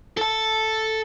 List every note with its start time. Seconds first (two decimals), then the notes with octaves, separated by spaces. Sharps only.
0.17 A4 A5